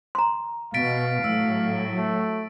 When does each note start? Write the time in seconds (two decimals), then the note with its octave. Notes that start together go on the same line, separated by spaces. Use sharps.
0.15 A#5 C6
0.74 B2 F5 A6 B6 D7
1.24 A2 F#3 E6
1.97 A3